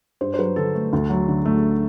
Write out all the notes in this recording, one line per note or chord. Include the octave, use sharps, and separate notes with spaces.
G2 C5
C5
F#3 B4
D3 A4
A3
D2
F#3
D3
A3